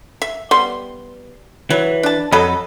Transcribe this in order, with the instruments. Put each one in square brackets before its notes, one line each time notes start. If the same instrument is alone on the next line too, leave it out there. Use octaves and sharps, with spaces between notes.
[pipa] E5
G3 B3 C6
[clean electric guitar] E3 [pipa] F#3
[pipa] D4 A5
[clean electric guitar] F2 D#5 B5 [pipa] F#3 A4